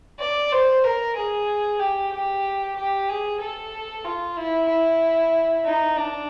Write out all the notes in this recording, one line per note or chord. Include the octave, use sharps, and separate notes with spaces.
D5
C5
A#4
G#4
G4
G4
G4
G#4
A4
F4
E4
E4
D#4
D4